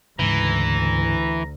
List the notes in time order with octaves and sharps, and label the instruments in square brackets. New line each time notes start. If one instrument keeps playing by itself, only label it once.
[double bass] D2 [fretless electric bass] G#2 C#3 [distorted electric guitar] E3 [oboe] A#5